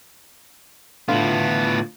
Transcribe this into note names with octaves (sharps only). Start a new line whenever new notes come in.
A2 D3 B3 F4